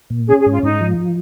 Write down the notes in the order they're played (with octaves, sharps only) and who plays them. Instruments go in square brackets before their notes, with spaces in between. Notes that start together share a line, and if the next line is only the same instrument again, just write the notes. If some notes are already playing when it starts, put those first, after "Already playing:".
[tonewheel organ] A#2
[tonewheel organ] C#4 [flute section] G#4
[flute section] G#4
[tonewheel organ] G#2
[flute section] F4
[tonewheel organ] G#2 [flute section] D#4
[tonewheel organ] F3